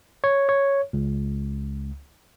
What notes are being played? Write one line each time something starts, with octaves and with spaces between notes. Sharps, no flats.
C#5
C#5
C#2